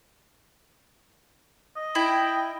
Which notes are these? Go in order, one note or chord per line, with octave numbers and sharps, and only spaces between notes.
D#5
E4 G5